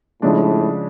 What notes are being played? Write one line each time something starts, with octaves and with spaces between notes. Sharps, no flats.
A2 C#3 F3 G#3 D4